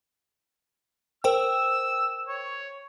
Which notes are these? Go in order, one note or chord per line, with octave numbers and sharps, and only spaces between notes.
A#4 C5 G5 E6
C#5